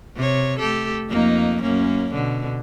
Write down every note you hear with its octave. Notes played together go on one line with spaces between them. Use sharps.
C3 C#5
A3 G4 A4
F2 A#3 D#4
F#2 A#3 C#4
B2 D3